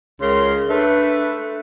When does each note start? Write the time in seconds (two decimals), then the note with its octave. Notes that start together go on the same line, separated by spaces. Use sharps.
0.21 C#2 C#3 A#4 C6
0.69 A3 D4 B4